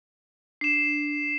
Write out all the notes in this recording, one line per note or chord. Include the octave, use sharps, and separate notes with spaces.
D4 C7 E7